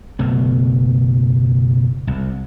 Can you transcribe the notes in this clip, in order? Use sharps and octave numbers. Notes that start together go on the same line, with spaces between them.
F#1 B2 A3
C2